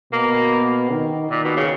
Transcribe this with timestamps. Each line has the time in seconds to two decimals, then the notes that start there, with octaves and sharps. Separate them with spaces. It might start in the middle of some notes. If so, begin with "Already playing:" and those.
0.13 B2 A#3
0.91 D#3
1.30 A#2 D#3
1.45 B2
1.57 C#3